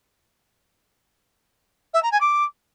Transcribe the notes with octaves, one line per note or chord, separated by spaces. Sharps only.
E5
A#5
G#5
D6